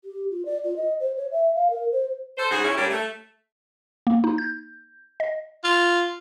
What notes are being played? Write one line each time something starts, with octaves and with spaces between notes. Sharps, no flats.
G4
F4
D5
F4
D#5
C5
C#5
E5
F5
A#4
C5
A4 C5
G#2 C#3 F#4 G#4
C#4 E4
G2 D3 G3 A#3 C#4 G4
A3
A#3
D#4
G6
D#5
F4